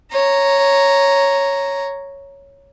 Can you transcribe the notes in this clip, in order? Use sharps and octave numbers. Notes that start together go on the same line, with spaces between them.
C#5 A#5